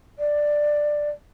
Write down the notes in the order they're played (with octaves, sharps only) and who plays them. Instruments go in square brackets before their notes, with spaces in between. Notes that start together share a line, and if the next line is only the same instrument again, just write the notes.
[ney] D5